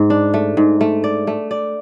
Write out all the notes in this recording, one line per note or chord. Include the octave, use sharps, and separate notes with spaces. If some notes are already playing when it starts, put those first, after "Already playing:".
Already playing: G#2
D4
A3
G#2
A3
D5
A3
D5